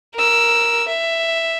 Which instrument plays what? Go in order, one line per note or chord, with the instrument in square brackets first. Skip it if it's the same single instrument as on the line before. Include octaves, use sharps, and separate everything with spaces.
[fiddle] A#4 E6
E5